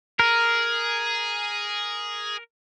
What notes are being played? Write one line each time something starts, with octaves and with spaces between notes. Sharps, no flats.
G#4 A#4